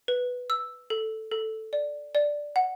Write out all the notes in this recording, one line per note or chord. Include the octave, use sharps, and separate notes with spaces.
B4
E6
A4
A4
D5
D5
F#5